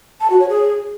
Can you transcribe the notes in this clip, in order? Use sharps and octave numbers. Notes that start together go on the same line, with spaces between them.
A5
F#4
C#5
G#4